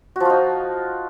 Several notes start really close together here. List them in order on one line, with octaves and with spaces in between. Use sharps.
F#4 F3 F4 D#4